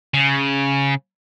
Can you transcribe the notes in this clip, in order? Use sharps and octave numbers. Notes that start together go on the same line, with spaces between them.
C#3